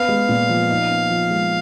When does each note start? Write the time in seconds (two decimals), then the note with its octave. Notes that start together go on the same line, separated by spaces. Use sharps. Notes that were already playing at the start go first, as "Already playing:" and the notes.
Already playing: B3 F5
0.08 G#3
0.29 A#2
0.49 F3
0.69 D#4
0.90 B3
1.10 F3
1.30 G#3